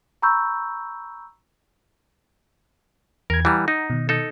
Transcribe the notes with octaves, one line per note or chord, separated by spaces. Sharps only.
A#5 B5 C#6 E6 G6
E2 A#4 G#6
E3 G3 F#5 A#5
D#4
B2 D#3
D#4 A4